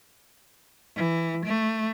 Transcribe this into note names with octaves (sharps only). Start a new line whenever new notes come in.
E3
A3